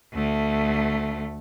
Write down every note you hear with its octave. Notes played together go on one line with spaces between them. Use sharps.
D2 A3